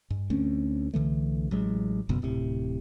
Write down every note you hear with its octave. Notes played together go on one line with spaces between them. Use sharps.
G2
D2 A3 C4 C#4
C2 D3 E3 A3
A1 F#3 G#3
F#1 F#2 B2 B3
D1 A2 C3